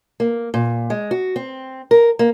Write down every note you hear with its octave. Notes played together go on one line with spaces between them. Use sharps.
A#3
A#2
G#3
F#4
C4
A#4
A#3